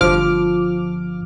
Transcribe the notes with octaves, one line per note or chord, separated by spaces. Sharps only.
G1 F3 D6 F6